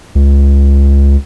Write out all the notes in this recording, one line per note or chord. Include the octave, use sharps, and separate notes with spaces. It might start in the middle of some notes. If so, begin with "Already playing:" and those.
C#2